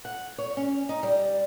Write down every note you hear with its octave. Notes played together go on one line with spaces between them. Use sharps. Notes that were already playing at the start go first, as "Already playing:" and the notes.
F#5
C#5
C#4
D#4
G3